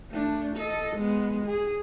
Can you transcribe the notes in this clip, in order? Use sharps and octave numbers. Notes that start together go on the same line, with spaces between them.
A3 D4
A4 D#5
G#3 B3
G#4